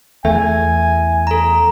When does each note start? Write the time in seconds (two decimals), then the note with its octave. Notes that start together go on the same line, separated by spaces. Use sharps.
0.25 E2 A3 E5 G#5
1.27 A4 A#5